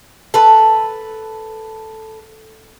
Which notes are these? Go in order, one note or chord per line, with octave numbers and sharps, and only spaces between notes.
A4 B4